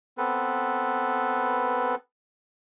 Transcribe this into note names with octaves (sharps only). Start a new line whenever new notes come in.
B3 C4 A4 B4